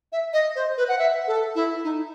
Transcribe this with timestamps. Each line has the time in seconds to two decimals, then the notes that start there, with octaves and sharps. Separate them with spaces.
0.12 E5
0.33 D#5
0.56 C5
0.77 B4
0.88 F#5
0.99 E5
1.27 A4
1.55 E4
1.84 D#4